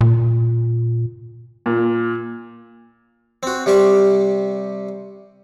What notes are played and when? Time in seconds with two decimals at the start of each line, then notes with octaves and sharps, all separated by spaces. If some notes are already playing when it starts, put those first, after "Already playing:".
0.01 A#2
1.66 A#2
3.43 C4 F#4
3.66 C3 G3 G4 C5 C#6